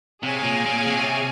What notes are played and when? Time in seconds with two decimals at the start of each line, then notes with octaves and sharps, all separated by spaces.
0.22 C3 G#4 C#5 F5 G#5
0.43 A#2
0.65 A#2
0.88 C3